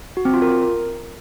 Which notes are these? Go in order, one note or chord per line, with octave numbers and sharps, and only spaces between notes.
F#4
C4
F4
A#4